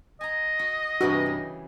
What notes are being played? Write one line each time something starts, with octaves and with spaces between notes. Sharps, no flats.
D#5 G#5 A#5
F#4
G2 C3 E3 F#4
C#3